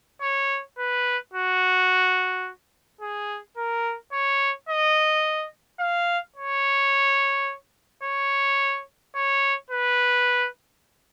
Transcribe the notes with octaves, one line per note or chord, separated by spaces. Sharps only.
C#5
B4
F#4
G#4
A#4
C#5
D#5
F5
C#5
C#5
C#5
B4